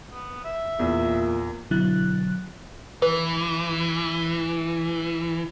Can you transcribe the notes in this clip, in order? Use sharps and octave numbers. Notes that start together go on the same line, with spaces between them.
B3
E5
E2 A#2
B2 D3 F#3 E4 F#6 A6
E3 B4